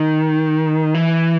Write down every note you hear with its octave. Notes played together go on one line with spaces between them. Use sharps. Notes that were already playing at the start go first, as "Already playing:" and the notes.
Already playing: D#3
E3